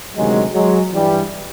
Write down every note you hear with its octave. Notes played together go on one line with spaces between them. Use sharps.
D2 C3 D#3 F#3 G#3
F#3 G#3
G2 E3 G3